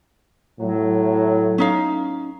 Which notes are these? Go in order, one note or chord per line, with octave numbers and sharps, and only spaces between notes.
A2 F#3
C#4 D#4 F5